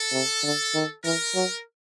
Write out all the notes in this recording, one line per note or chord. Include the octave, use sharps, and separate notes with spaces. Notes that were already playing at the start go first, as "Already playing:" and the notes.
Already playing: A4
C3
D3
D#3
E3 A#4
F#3